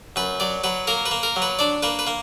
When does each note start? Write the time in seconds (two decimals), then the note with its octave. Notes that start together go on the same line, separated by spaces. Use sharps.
0.16 F#2 B4
0.40 F#3 D5
0.64 F#3 B4
0.87 A#3 A#4
1.06 B4
1.11 A#3
1.23 A#4
1.36 F#3
1.42 B4
1.59 D4 D5
1.83 A#3 B4
1.99 B4
2.07 A#3